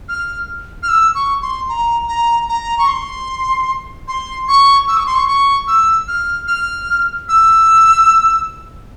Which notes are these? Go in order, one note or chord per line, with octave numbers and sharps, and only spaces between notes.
F6
F6
E6
C#6
C6
A#5
A#5
A#5
C#6
C6
C6
C#6
E6
C#6
C6
C#6
C#6
E6
F6
F6
E6